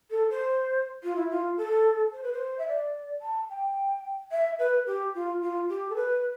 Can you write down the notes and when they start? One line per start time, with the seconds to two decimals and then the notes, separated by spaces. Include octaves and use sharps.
0.11 A4
0.30 C5
1.03 F4
1.16 E4
1.30 F4
1.57 A4
2.13 C5
2.23 B4
2.33 C5
2.59 E5
2.68 D5
3.22 A5
3.50 G5
4.32 E5
4.59 B4
4.87 G4
5.15 F4
5.42 F4
5.69 G4
5.90 A4
5.96 B4